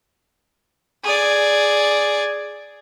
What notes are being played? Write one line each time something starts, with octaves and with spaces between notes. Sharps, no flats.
G#4 D5